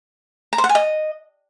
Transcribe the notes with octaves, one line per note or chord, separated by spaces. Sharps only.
A#5
C5
F#5
G#5
D#5